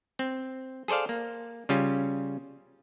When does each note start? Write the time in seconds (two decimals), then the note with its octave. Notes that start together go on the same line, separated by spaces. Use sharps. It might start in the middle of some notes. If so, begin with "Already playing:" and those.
0.19 C4
0.88 G#4 A4 C5 D5 F5
1.09 A#3
1.69 C#3 G3 C#4 F4